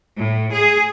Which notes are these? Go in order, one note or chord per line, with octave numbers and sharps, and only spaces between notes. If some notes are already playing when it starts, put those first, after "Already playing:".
A2
G#4